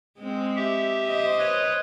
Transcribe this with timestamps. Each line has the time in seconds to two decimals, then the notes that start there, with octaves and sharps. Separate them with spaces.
0.19 G#3 C4
0.56 G4 E5
1.06 C5 D#5
1.39 B4 C#5